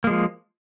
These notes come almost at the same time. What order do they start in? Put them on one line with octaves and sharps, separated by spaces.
A#3 G#3 F3